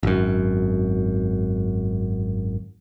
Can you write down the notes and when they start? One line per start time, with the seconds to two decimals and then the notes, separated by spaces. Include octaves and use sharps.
0.03 G#1 F#2